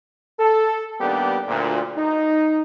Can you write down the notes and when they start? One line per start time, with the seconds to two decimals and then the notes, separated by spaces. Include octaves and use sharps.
0.40 A4
1.01 D#3 G3 A#3 B3 D4 G4
1.48 D2 A#2
1.97 D#4